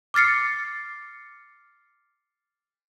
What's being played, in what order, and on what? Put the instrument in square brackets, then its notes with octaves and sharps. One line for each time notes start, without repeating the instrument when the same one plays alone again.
[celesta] D6 F6 A6 C7 C#7